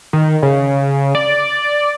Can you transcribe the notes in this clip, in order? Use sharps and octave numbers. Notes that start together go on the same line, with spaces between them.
D#3
C#3
D5